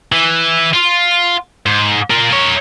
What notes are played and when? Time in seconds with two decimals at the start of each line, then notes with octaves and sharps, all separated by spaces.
0.12 E3
0.74 F4
1.66 G#2
2.10 F4 A#4
2.31 A#4 C#5